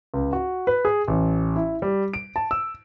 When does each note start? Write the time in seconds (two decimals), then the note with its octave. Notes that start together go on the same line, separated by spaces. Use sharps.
0.14 C#2
0.33 F#4
0.67 B4
0.85 G#4
1.08 A1
1.56 E4
1.82 G3
2.14 D7
2.36 A5
2.51 E6